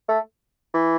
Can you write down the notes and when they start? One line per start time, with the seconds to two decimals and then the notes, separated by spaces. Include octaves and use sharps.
0.09 A3
0.74 E3